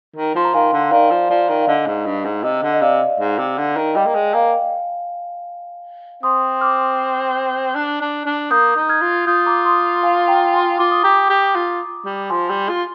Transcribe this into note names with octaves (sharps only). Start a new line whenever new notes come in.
D#3
F3 C6
A#5
D#3 F5 G#5
D3
D#3 D5 F5
F3
F3 D5
D#3
F5
D3 D#5
G#2
G2
G#2
C3 D#5
D3
D#5
C3 D5 F5
G#2
C3
D3
D#3
G3 D#5 G5
A#3
G#3
A#3 F5 G#5
C4 C6 D#6
D6 F6
D4
D4
D4
A#3 D#6 G6
D#4
F6 G#6
F4
F4 D#6 G6
A#5 D6
C6 D#6
F5 G#5
G5 A#5
G#5 C6
F4 D6
D#6
G4 A#5 D6
G4
F4
G3
F3 G#5 C6
G3
F4